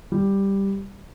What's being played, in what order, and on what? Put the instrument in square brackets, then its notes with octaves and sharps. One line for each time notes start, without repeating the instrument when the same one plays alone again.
[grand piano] G3